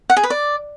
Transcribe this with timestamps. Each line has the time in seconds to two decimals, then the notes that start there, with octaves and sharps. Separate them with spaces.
0.10 F#5
0.17 G#4
0.23 B4
0.30 D5